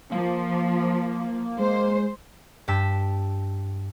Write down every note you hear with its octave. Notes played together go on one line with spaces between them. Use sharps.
F3 A#3
G#3 C5
G2 G5 A5 E6 B6